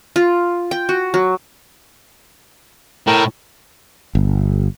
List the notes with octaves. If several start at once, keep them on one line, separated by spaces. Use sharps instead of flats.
F4
G5
F#4
F#3
A2 A#4 G5
G1